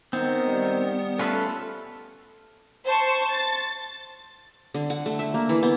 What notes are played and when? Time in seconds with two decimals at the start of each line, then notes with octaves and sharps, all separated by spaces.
0.13 D#3 B3 C4 D#4
0.48 G3
1.19 A3 C#4 F4 A4 B4
2.85 C5 A5 C#6
3.29 A6
4.74 D3
4.90 F#5
5.06 A3
5.19 E5
5.34 A#3
5.49 E3
5.63 B3